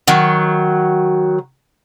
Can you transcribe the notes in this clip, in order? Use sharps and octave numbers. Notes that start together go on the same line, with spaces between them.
D#3 F#3